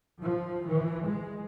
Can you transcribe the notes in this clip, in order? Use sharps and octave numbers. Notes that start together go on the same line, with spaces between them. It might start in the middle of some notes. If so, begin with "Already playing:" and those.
F3
E3
G#3